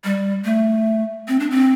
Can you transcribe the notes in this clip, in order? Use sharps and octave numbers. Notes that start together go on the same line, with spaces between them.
G3
A3
C4
D4
C4